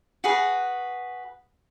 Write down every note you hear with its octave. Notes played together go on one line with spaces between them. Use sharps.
F#4 G#4 B4